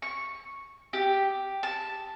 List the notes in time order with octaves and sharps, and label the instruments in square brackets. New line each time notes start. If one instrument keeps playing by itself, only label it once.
[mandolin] C#6
G4
A5